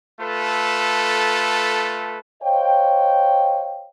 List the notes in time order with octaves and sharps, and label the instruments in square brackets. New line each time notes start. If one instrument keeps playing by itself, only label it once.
[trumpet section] A3 F4 A4 B4
[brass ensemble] C5 C#5 D#5 F5 G5